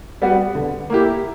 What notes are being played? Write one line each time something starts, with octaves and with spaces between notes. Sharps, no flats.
G3 B3 F#4
D3
A#3 E4 G4